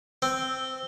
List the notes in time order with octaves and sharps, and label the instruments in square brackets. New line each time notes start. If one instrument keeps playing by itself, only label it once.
[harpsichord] C4 [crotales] E6